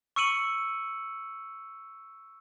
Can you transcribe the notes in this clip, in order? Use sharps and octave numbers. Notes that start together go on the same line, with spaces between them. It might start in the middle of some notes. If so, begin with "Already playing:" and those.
C#6 E6 C#7 D#7 F#7